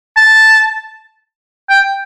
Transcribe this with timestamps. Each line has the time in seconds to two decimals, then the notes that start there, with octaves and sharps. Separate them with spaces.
0.17 A5
1.70 G5